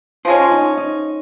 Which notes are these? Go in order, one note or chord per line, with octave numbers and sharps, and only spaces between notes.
F3 G#3 C#4 F4
D#4
D#4